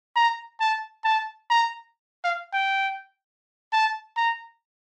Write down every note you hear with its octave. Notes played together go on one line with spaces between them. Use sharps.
A#5
A5
A5
A#5
F5
G5
A5
A#5